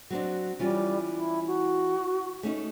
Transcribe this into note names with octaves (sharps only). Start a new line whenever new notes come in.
F#3 C4 D4
E3 G3 C#4 F4
E4
F#4
A3 C#4 D#4